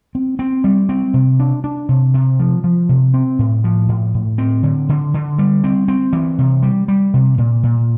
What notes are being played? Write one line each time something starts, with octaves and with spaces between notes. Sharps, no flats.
C4
C4
G3
C4
C3
D4
D4
C3
C3
F3
F3
C3
C4
A2
F3
A2
A2
C4
D3
D3
D3
G3
C4
C4
E3
C3
G3
G3
C3
A#2
A#2